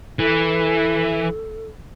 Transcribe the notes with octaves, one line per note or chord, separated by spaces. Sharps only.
E3 A4